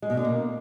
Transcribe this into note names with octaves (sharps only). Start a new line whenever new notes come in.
G#3
B2
D3
A#3